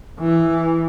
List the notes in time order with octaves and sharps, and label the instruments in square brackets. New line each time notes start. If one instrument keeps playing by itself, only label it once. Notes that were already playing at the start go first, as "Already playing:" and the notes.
[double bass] E3